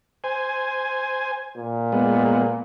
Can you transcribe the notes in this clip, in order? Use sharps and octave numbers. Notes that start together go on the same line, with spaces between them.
C5 G#5
A#2
G#3 B3